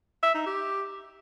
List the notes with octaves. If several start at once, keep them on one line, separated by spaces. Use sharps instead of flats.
E5
D#4
G4